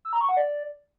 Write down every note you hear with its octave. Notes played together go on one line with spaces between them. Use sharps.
E6
A#5
C#6
F#5
D5